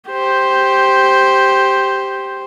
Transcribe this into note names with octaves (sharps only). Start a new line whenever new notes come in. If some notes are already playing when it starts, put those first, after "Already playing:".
G4 C5